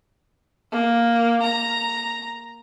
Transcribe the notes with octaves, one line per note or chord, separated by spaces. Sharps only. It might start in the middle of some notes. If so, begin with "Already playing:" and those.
A#3
A#5